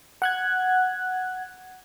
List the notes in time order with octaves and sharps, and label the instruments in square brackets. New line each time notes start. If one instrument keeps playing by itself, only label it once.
[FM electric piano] F#5 F#6 G#6